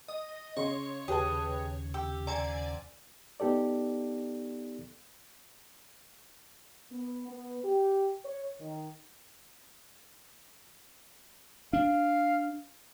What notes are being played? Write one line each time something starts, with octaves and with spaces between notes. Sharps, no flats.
D#5
C#3 C#5 C6
D#2 C#3 G4 G#4 B4 D#5 A5
G4 G5 E6
D3 C4 D5 G#5 A#5
B3 D#4 G4 A4 D5
B3
B3
G4
C#5
D#3
D4 F5